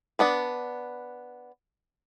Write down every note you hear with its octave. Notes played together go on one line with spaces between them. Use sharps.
B3 D4 B4